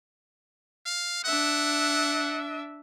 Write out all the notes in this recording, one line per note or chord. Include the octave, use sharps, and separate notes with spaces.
F5
D4 E5 F#5